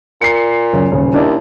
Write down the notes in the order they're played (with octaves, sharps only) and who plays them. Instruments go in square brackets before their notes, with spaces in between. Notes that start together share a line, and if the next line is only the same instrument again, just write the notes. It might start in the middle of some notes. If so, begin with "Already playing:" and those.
[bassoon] A#2 [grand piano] C7 C#7
[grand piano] F#2 C#3
D#1 C#3
[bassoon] D#2 [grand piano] D4 E4 D5